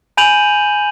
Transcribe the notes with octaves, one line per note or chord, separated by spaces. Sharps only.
G#5 B5 G6 D#7 F7 F#7